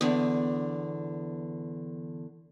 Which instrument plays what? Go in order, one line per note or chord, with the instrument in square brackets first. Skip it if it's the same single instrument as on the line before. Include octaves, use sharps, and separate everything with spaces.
[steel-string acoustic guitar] E2 D3